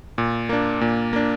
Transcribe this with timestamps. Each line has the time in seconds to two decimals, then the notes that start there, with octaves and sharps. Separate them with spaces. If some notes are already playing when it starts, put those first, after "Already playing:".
0.18 A#2
0.49 A#3 D4
0.81 A#2
1.13 A#3 D4